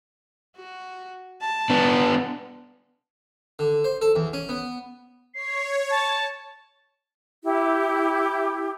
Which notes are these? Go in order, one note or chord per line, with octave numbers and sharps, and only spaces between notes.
F#4
A5
B3 D4
D3
C5
A4
E2
C#4
B3
C#5 C7
A5
E4 G4